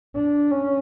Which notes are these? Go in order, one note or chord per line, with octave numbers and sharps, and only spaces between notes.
D4
C#4